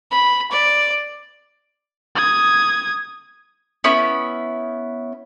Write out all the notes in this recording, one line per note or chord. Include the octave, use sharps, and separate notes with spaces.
B5
D5
D#6 G#6
B3 C#4 E4 B5